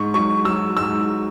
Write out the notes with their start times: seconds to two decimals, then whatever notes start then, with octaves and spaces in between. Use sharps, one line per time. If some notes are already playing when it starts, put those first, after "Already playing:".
Already playing: G#2 C#6
0.14 F#3 C#6
0.45 F#3 E6
0.77 G#2 E6